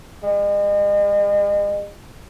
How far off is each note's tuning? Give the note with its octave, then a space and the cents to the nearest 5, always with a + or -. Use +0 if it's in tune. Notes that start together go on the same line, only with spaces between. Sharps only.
G#3 -40